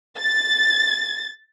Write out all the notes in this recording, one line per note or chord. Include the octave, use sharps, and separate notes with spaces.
A6